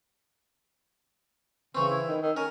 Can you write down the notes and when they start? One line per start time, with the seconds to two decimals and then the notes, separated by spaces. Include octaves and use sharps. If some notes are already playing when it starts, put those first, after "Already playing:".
1.75 C#3 E3 C4 C#6
1.88 E4
2.08 D#3
2.22 D#3 E6
2.37 C#4 A#4 F6